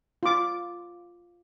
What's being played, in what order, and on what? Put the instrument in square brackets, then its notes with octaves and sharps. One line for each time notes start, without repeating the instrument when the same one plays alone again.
[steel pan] F4 D6